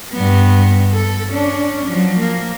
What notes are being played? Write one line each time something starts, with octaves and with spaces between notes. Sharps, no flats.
G2 B3
A4
C#4 D4
F3 F#3
A#3